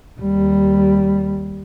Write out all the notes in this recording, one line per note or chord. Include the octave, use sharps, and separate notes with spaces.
D#2 G3